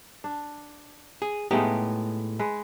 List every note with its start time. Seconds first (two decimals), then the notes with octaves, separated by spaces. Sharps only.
0.24 D4
1.22 G#4
1.51 A2 G#3 A3 B3 D#4 G4
2.39 G#3 B4